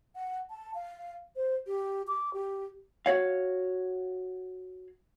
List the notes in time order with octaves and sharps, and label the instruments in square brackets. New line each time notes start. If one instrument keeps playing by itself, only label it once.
[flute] F#5
A5
F5
C5
G4
D6
G4
[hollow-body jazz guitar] F#4 C#5 F5